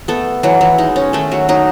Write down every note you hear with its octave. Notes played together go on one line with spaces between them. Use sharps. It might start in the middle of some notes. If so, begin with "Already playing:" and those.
A3 B3 A4
E3 F#3 F#4
E3 E4
G#3 D#4
C#4
D#3 A3 A4
F#3 F#4
F#3 D#4